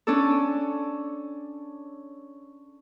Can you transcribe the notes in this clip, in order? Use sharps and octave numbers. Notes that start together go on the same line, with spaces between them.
C#4 D4 A4